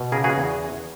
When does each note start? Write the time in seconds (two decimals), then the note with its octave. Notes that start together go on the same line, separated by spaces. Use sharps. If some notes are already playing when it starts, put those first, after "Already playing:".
Already playing: B2
0.12 C#3 G#4 A#4
0.24 F#4 G#4
0.38 E2